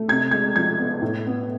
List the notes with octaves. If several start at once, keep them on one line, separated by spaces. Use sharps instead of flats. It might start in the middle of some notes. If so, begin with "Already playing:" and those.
Already playing: A3
C3 G#6
G#3 G#6
F3 G#6
B3
A2
B3